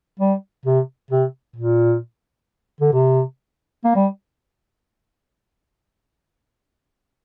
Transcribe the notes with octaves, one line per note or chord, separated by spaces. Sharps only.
G3
C3
C3
A#2
D3
C3
A#3
G3